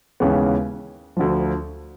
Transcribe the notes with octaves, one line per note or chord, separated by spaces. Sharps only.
D#2 C#3 E3 G#3 B3
D2 D3 F3